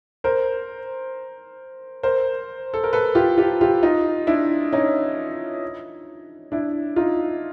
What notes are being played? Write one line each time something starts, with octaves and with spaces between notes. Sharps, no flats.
A#4 C5
A#4 C5
A4
A#4
A4 B4
F4 G4
F4 G4
F4 G4
D#4 F4
D4 E4
C#4 D#4
D4 E4
D#4 F4